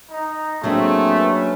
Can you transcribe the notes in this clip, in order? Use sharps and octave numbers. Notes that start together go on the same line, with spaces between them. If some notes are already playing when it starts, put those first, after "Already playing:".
D#4
F#3 A3 A#3 C4 D4 G#4
C#4 B4